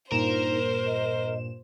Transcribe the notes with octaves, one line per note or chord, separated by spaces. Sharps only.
G2 A#2 D#4 A#4 C5 E7
D#5